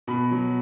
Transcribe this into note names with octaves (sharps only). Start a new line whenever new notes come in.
B2 B5
F#3